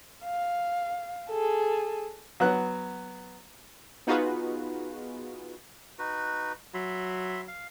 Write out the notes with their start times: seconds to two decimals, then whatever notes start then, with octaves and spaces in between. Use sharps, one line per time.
0.24 F5
1.30 G#4 A4
2.40 F#3 B3 F#6
4.07 B3 D#4 F4 F#4 G#4 B4
5.99 D#4 F#4 B4
6.74 F#3 E5 B5 C6
7.48 F5